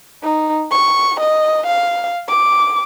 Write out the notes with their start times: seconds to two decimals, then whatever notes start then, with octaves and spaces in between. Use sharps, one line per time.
0.23 D#4
0.72 C#6
1.21 D#5
1.67 F5
2.29 D6